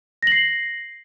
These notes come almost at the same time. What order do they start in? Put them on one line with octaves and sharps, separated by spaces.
A#6 F#7 C7